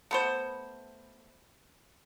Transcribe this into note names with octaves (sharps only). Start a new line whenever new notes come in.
A3 B3 C5